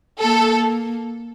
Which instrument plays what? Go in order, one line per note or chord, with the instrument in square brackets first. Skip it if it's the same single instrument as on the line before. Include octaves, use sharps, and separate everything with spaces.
[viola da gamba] A#3 [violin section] A4